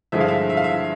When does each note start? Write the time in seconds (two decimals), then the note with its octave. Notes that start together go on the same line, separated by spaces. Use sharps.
0.12 G2 D3 F3 G#3 E5
0.20 F5
0.29 E5
0.50 E5
0.57 F5
0.64 E5